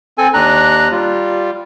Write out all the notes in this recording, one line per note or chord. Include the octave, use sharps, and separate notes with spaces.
C4 A4 G#5
D#2 D4 A#5 F#6
G3 F4